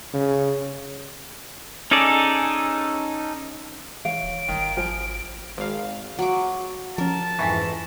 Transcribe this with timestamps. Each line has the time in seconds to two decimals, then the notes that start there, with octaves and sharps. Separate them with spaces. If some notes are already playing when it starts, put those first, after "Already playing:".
0.14 C#3
1.91 C#4 D#4 G#4 A4 D5
4.05 E3 C#5 F5 D7
4.23 D#1
4.48 G#1 D#3
4.77 F3 G#5
5.58 G#1 F5
6.19 F#3 D6
6.98 F3 C#4 A#4 A5
7.39 F2 G#2 E3 C#6 A#6 B6